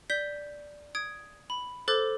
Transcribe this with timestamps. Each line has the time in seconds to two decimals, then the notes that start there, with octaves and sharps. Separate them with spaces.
0.10 D5 G6 B6 G7
0.95 D#6 G#6 D7
1.50 B5
1.88 A4 C5 D6 F#6 A6